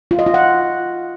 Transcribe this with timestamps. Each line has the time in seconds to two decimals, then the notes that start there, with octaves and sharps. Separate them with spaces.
0.11 F4
0.19 D#5
0.26 F4
0.34 F#5